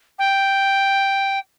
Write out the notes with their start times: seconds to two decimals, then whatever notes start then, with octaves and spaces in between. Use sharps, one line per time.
0.19 G5